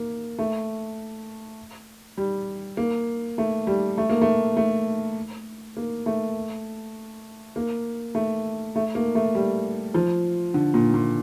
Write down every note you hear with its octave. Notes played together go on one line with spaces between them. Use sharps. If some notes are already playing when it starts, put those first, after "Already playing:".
Already playing: A#3
A3
G3
A#3
A3
G3
A3
A#3
A3
A3
A#3
A3
A#3
A3
A3
A#3
A3
G3
F3
D3
A#2
A#2